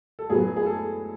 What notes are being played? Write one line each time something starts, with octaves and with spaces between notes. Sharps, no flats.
A4
A2 F#3 B3 G#4
G#4
A4